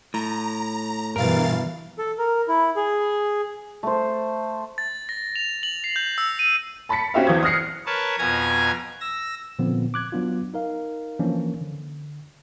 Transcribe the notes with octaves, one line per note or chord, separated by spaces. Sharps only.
A2 A#5
G2 B2 E3 A#4 F5 A6
A4
A#4
E4
G#4
A3 C5
A6
A#6
F7
F#7
C7
G6
E6
D#7
A5 B5 A6 B6 C#7
C4 C#4 F#4 G4 E5 F5
E2 E3 C4 D#6 G#6
D#6 F6 F#6 A#6 C7 C#7
A#4 B4 C#5 A5
F2 B2 G#5 A#5 G#6 A#6
E6 A#6
A#2 D3 F3 B3 C4
D6 F#6 G#6
F#3 B3 D4 F4
D#4 A#4 F5
E3 F3 A#3 C#4 D4
D3